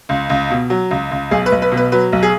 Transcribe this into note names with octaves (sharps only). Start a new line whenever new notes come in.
C#2
C#2
B2
F#3
C#2
C#2
B1 G#4
B4
B1
B4
B2
B4
F#3 B4
B1
G#4